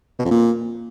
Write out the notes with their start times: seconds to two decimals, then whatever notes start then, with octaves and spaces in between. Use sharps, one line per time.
0.19 B2
0.25 F2
0.31 A#2